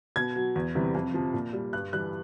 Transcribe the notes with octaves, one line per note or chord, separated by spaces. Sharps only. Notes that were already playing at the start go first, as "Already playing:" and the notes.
B2 G#6
F#3
E2
C3 E3 G3
F2
C3 F3
A#2
G3
G2 F#6
E3 G3 F#6